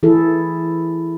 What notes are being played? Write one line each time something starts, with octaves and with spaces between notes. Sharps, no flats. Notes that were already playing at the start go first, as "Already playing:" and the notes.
E3 E4 G#4 A4